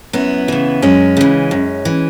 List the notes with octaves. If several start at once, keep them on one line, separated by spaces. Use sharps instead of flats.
F#2 B3 E4
C#3 E3
F#2 G#3 C#4
C#3 E3
F#2
E3